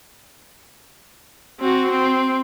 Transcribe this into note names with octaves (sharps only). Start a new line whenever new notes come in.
C4 F#4
C4